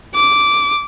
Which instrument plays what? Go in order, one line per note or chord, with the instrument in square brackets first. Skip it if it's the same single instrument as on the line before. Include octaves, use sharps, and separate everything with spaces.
[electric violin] D6